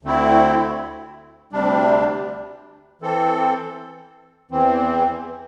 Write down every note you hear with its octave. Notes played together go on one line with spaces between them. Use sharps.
D2 D3 A3 C4 E4
D2 C3 G3 D4
E3 C4 A4
E2 E3 C4